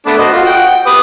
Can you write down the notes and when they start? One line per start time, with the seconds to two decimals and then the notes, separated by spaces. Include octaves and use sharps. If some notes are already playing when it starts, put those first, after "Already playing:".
0.06 A3 B3 D4
0.18 F#4 C5 D#5
0.32 F4 F#4
0.46 F#5 G5
0.67 G5
0.86 G4 B4 D#6